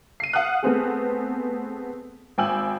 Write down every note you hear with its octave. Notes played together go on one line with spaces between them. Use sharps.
C7 D#7
F5 F#5 D#6 F6 F#6
A3 B3 C4 G#4
G#1 G5 G#5 E6 F#7